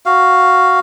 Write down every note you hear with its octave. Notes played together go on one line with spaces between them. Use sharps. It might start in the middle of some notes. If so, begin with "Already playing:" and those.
F#4 F5